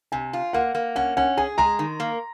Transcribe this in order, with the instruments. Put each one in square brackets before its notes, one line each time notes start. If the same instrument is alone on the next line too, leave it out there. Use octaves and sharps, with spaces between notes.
[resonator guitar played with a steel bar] C3 [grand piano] G#5
[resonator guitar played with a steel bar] F4
[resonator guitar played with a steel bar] A#3 [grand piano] F#5
[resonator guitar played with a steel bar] A#3
[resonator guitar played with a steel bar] C#4 [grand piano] F#5
[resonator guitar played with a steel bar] C#4 [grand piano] F#5
[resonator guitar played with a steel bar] G#4 [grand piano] G#5
[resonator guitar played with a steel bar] G#3 [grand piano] A#5
[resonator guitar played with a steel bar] D#3
A#3